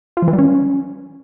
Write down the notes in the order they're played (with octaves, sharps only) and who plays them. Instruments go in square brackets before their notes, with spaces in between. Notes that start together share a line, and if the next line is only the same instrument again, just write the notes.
[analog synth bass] F4
F3
E3
G3
C#4